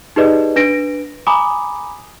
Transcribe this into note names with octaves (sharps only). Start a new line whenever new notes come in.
D#4 G4 G#4 B4 D5 D#5
D4 B4 A#6 D7
G#5 A#5 B5 D6 D#6